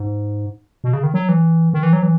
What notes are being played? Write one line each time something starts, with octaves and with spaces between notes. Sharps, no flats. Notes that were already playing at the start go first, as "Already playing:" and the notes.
Already playing: G#2
B2
C#3
D#3
F#3
E3
D#3
E3
F#3
E3